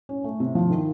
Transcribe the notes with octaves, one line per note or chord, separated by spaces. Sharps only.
C#4
A3
C3
F3
D#3